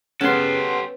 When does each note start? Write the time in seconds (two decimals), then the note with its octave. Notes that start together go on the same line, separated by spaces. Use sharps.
0.21 C#3 B3 C#4 G4 A4 F#5 C6